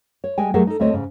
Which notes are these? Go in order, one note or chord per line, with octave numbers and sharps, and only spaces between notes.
C#5
G3 G#3 G5 G#5
F#3 A3 G4 G#4 A#4 F#5
D#4 A4
D2 A3 C4 C#5 D#5
G#2 C#3